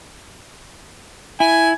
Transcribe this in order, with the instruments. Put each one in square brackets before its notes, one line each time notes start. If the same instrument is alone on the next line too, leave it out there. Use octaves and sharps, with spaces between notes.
[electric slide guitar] E4 [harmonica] G#5